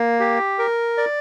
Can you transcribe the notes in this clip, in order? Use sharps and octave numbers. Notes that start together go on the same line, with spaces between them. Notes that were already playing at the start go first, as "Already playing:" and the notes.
Already playing: A#3
G4
A#4
D5